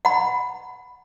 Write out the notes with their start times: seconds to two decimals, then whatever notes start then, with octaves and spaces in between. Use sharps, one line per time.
0.05 F#5 B5